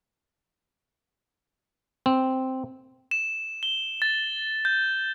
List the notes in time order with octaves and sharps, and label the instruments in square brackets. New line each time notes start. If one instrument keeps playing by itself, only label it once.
[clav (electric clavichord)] C4
[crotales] E7
G7
A6
G6